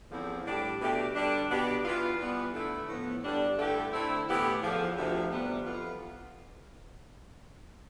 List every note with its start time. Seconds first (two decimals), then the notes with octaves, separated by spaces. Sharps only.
0.11 E2 D3 F3 C4 E4
0.45 A2 G3 D4 G4
0.81 B2 A3 D4 G4
1.15 D3 G3 D4
1.50 B2 B3 D4 G4
1.85 E3 B3 F4
2.20 E3 G3 B3
2.53 D3 A3 E4
2.88 A2 F3 B3
3.24 G2 D3 G3 D4
3.58 G2 D3 A3 E4 G4
3.93 D3 A3 C4 E4
4.27 A2 E3 B3 E4 G4
4.62 E2 D3 F3
4.97 D2 C3 F3
5.31 D2 C3 G3 B3
5.66 F2 E3 B3 F4